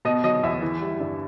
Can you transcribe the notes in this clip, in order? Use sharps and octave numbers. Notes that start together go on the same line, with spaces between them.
B2 D#5
F#3 D#5
E2 E5
E3
G3
G2